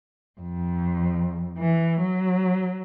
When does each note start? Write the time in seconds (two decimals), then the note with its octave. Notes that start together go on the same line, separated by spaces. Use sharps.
0.40 F2
1.58 E3
2.01 F#3